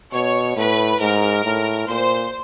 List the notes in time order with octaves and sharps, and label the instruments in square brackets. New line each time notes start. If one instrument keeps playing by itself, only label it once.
[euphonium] B2 [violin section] C#5
[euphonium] A2 [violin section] B4
[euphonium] G#2 [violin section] A#4
[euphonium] A2
[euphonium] A#2 [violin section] C5